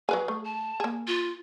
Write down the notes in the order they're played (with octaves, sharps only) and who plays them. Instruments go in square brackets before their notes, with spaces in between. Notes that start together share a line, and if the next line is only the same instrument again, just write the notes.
[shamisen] F#3 B4 G#5 [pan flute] G#4
[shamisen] A3
[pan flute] A5
[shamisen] A#3 G#4
[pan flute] F4